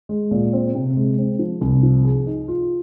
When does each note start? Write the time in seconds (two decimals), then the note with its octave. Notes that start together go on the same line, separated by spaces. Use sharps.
0.09 G#3
0.31 A#2
0.53 C4
0.75 C3
0.96 G#3
1.18 C4
1.39 F3
1.61 C2
1.83 F3
2.05 G#4
2.26 D#4
2.48 F4